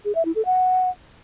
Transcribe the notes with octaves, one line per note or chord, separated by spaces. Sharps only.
G#4
E5
E4
A4
F#5